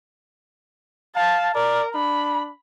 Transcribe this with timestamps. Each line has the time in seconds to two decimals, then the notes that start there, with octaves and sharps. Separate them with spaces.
1.16 F5 A5
1.55 A#4 D5
1.95 D4 B5